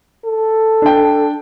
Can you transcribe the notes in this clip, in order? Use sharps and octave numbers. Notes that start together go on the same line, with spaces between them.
A4
D4 G5